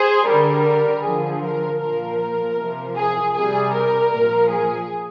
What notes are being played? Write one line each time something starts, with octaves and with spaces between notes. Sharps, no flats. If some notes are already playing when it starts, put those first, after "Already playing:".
Already playing: G#4 C5
D3 G3 A#4
D3 F3 G#4
A#4
A#2 F3 A#4
C3 F3
G#4
C3 G3 G#4
A#4
A#2 F3
G#4